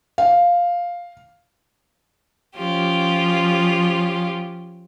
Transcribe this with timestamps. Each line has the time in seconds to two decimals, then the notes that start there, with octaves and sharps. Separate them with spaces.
0.18 F5
2.55 F3 C#4 F4 G4